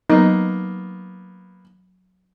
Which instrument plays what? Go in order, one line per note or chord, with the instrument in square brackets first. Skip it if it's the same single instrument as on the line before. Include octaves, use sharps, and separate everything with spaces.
[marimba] F#3 [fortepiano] A#3 B3 [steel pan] D#4